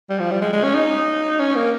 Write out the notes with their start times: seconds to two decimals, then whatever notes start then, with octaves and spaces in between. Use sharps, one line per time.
0.10 G3
0.20 F3
0.31 G3
0.42 G#3
0.53 G#3
0.64 C#4
0.75 D#4
1.40 C#4
1.55 A#3